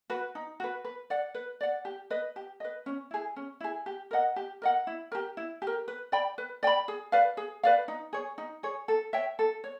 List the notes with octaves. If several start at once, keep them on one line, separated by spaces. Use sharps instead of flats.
F#4 B4
D#4
F#4 B4
B4
D5 F#5
B4
D5 F#5
G4
B4 D#5
G4
B4 D#5
C#4
E4 G#4
C#4
E4 G#4
G4
A#4 D#5 F#5
G4
A#4 D#5 F#5
E4
G4 A#4
E4
G4
A#4
B4
D5 G5 B5
B4
D5 G5 B5
G#4
B4 D5 F5
G#4
B4 D5 F5
D#4
G#4 C#5
D#4
G#4 C#5
A4
C#5 E5 G5
A4
C#5